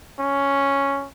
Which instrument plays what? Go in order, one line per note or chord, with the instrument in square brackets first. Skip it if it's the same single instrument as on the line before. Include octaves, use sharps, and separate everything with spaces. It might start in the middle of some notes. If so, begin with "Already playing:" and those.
[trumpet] C#4